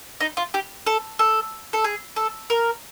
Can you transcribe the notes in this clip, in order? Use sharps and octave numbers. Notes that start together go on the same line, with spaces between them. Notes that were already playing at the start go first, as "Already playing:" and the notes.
D#4
F4
G4
A4
A4
A4
G#4
A4
A#4